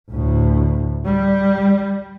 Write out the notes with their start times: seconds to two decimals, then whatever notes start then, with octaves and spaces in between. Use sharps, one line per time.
0.11 D2 A2
1.05 G3